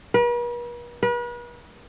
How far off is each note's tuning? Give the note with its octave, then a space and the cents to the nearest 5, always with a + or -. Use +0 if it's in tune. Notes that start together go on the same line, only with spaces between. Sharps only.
B4 -45
B4 -40